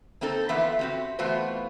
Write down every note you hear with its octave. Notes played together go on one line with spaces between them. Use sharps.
A#3 C4 D#4 A4
E3 F3 B3 F4 E5
C4 F#4 G4
E3 A3 B3 F4 F#4 C5